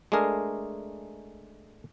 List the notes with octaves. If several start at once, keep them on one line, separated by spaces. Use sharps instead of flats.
G#3 A3 D4 G#4 A#4